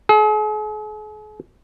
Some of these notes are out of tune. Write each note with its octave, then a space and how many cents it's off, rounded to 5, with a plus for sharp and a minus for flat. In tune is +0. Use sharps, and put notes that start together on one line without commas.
G#4 +45